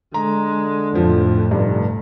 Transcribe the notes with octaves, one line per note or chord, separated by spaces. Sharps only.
D3 G#3 A#5
F2 A2 F3 C4
F1 G2